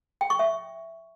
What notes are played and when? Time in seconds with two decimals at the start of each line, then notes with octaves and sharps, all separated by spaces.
0.21 G5
0.30 C#6
0.39 E5